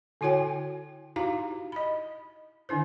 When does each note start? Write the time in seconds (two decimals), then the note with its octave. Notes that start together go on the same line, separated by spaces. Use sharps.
0.21 D3 E4 F#4 C#5 G5 G#5
1.16 D#4 E4 F#4 G4 F5 A#5
1.72 D#5 B5
2.69 D3 D#3 D4 E4 C5